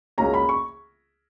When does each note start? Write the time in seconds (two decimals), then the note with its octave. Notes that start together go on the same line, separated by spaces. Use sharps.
0.18 C#2 C#3 F#3 A#3 C#4 A#5
0.34 B5
0.49 C#6